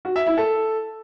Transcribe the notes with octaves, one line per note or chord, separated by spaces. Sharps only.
F#4
E5
E4
A4